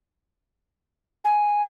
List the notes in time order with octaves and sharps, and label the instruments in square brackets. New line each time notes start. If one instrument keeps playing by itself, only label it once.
[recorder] G#5